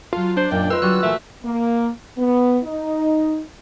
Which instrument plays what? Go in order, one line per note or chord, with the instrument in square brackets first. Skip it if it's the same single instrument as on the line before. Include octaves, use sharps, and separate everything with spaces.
[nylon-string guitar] F#3 A4 [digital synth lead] F4
[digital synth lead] D4 [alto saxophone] C5
[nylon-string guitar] F#2 A#2 D#4 [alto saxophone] G5
[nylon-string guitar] A3 D#4 C5 [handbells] F4 B4 [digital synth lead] E6
[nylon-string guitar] D3 F#3 [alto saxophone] G3 [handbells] F#4 F#6
[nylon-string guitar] A#2 E3 [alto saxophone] A3 [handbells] E5
[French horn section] A#3
B3
D#4